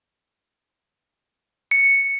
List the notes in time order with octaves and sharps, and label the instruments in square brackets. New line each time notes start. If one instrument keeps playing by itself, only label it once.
[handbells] C#7